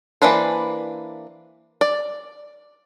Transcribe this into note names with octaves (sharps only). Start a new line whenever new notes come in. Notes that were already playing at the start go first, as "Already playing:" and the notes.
E3 A#3 D4 B4 C5
D5